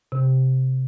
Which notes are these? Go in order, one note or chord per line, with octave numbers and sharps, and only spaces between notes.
C3